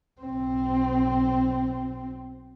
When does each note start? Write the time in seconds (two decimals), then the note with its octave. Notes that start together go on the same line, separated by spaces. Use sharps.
0.21 B1 C4